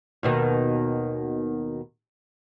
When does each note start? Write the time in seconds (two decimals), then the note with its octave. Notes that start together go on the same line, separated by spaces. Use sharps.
0.23 D#2 B2 D#3